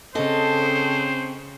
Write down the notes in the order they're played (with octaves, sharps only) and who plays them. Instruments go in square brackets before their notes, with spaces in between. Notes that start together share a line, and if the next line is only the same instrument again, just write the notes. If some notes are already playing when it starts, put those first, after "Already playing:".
[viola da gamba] C#3 [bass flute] C4 [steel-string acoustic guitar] A4 D#5 [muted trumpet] C5